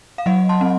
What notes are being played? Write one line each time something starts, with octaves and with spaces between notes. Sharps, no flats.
F5
F#3 D#5 F#5
A5 C6
C4